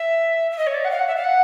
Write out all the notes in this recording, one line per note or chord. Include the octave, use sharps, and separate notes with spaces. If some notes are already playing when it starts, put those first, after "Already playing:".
Already playing: E5
E5
D#5
C#5
D5
F#5
F5
F#5
E5
F5
F#5